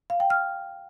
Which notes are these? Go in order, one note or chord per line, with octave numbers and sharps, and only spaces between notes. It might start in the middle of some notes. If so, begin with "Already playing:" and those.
F5
G5
F6